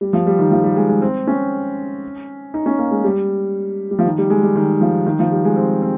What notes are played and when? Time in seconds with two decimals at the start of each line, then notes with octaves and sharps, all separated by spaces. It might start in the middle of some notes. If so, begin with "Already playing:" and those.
0.01 G3
0.13 F3
0.27 G3
0.39 D#3
0.51 F3
0.64 G3
0.76 G#3
0.89 G#3
1.02 C4
1.27 C#4
2.54 D#4
2.66 C#4
2.78 A#3
2.91 G#3
3.04 G3
3.91 G3
3.99 F3
4.05 D#3
4.18 G3
4.30 G#3
4.42 G3
4.56 D#3
4.81 F3
5.06 D#3
5.19 F3
5.32 G3
5.45 G#3
5.56 C4
5.82 C4